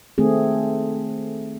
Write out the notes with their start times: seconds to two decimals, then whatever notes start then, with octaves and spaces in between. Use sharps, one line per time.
0.18 D#3 A3 C4 G#4